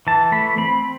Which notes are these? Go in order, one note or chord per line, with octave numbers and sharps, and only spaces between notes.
E3 A5
A3 B5
C4 B5